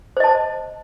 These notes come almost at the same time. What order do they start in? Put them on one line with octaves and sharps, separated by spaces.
C5 D#5 A5